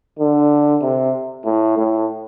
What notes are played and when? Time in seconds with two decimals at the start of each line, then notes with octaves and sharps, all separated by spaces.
0.19 D3
0.82 C3
1.45 A2
1.77 A2